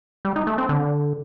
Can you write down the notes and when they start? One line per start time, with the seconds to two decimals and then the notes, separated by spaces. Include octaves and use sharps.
0.25 G3
0.36 D#4
0.47 A3
0.58 C4
0.69 D3